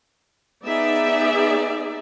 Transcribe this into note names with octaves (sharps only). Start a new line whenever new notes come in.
B3 D#4 G#4 D5 E5